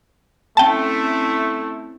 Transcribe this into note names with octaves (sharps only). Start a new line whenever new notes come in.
A3 C4 C#4 E4 G5 A5